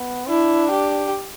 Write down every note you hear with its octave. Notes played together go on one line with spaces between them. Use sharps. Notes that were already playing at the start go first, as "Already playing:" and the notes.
Already playing: B3
D4 E4
G4